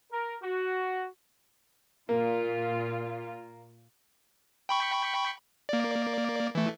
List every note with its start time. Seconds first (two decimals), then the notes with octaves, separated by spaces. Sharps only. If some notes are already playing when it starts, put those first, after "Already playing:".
0.12 A#4
0.42 F#4
2.09 A#2 A#3 F4
4.69 G5 B5 C#6
5.69 A#3 D5
6.55 E3 A3